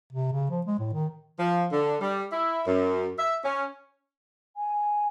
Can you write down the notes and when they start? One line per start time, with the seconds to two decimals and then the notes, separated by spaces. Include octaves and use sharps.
0.13 C3
0.33 C#3
0.50 F3
0.66 G#3
0.79 A2
0.94 D#3
1.39 F3
1.72 D3
2.01 G3
2.32 E4
2.66 F#2
3.19 E5
3.44 C#4
4.56 G#5